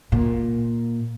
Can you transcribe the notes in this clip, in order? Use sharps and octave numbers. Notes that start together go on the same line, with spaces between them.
A#2